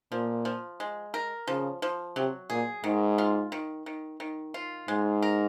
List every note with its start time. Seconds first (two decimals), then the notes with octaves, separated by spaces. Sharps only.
0.12 A#2 F3
0.45 F3
0.80 G#3
1.14 A#4
1.47 C#3 F3
1.82 F3
2.16 C3 F#3
2.50 A#2 G#4
2.84 G#2 D#3
3.18 F4
3.52 D#3
3.86 D#3
4.20 D#3
4.54 F4
4.88 G#2 G#3
5.22 A#4